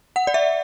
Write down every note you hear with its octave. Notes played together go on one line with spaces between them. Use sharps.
F#5
D5
E5